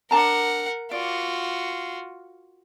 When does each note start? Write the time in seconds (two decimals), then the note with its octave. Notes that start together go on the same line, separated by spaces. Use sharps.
0.11 D4 A#4 F#5 A5 A#5
0.91 F4 F#4 D5